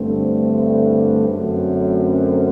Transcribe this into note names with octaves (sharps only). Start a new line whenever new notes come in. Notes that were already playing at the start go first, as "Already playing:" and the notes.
Already playing: G2 D3 A3 C4
F#2 D3 A3 C4